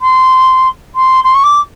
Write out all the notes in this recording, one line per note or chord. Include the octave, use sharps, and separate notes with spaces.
C6
C6
C6
C#6
D6